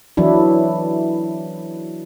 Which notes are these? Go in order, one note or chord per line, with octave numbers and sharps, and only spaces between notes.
E3 F#3 D4 E4